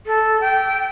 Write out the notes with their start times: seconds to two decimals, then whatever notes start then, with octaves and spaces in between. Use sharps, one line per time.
0.06 A4
0.41 G5